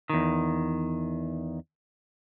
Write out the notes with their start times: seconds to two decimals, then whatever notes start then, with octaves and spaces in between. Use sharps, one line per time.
0.10 E2 D#3